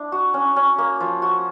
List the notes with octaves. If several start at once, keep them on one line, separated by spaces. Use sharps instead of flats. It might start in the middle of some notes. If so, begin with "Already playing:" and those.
Already playing: D4 E4
F#4
C#4
C#4
A#3
F3
F#4